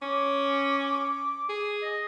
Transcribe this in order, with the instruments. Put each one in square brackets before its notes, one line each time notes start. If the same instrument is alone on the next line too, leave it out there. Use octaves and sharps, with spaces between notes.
[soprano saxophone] C#4 [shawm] D6
[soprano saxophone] G#4
[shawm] D#5